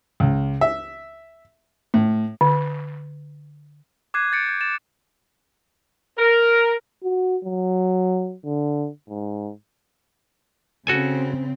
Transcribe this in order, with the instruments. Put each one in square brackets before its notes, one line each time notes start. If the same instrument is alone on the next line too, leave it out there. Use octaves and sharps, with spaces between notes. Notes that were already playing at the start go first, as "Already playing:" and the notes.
[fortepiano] C#2
E5
A2
[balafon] D3
[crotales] D6 F#6 G#6 C7 D#7
G6 A6 C#7 D7
G6 G#6
A6 E7
[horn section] A#4
[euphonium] F#4
F#3
D3
G#2
[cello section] C#3 C4 [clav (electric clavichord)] F#4 A4 G#5